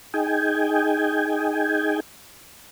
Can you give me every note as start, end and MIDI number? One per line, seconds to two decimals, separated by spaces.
0.14 2.00 63
0.14 2.00 68
0.14 2.00 79
0.14 2.00 80